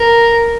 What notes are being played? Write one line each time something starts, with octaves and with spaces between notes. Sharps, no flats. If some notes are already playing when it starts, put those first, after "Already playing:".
Already playing: A#4